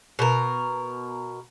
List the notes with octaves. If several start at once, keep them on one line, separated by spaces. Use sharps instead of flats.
B2 A#4